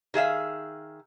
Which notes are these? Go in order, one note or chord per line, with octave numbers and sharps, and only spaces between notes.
D#3 G#4 E5 F5